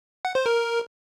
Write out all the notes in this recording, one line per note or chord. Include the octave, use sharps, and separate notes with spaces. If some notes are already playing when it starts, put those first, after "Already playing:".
F#5
C5
A#4